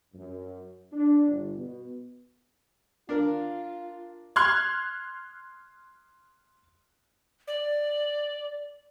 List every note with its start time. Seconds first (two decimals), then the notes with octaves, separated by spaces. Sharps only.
0.14 F#2
0.92 D4
1.28 G1
1.57 B2
3.09 D4 F4 A#4
4.36 C6 F6 F#6 G#6
7.48 D5